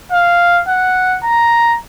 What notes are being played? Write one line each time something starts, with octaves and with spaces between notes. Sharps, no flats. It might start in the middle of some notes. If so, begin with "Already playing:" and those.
F5
F#5
A#5